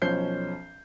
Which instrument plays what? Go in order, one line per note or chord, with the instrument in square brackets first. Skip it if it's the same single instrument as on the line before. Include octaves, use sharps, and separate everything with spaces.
[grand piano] B1 F3 C#4 C5 G6 C7